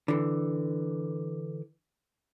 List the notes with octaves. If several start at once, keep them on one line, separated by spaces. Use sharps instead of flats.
D3 E3